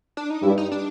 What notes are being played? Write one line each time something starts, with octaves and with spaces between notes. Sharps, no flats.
D4
D#4
G2 G3 E4
D#4
D4